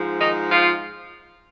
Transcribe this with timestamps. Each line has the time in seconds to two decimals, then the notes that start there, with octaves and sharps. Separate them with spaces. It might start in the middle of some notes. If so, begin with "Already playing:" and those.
Already playing: G#2 F3
0.20 D#3 D#4
0.51 F3 F4